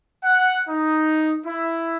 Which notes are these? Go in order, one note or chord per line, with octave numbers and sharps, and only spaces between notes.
F#5
D#4
E4